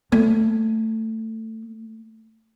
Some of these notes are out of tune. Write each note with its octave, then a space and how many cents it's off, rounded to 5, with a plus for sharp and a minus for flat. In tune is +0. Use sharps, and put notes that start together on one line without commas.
A3 +15